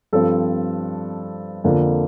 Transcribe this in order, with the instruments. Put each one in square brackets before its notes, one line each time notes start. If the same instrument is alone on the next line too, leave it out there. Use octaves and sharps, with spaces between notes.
[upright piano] G2 F3 C4 A4
F2 D3 F3 A#3